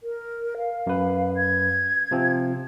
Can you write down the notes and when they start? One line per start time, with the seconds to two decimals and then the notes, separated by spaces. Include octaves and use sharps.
0.03 A#4
0.57 F5
0.87 F#2 B4
1.36 G#6
2.11 C3 F3 C4